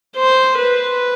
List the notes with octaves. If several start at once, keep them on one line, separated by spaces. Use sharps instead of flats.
C5
B4